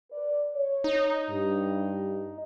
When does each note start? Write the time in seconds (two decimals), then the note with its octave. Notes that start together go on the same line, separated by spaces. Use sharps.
0.11 B4 D5
0.54 C#5
0.84 D#4
1.29 G2